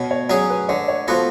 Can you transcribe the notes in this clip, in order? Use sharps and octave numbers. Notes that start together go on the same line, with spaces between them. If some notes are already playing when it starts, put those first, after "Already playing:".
Already playing: B2 C#5
C#5
F#3 C#4 G#4 C#5
B4
D3 C#5
C#5
F3 B3 F#4 A4